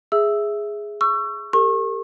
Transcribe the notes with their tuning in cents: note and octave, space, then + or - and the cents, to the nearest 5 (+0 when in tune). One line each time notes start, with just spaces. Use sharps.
G#4 +0 E5 +0 E6 +0
C#6 +0 E6 +35
G4 +25 A#4 -40 C#6 -35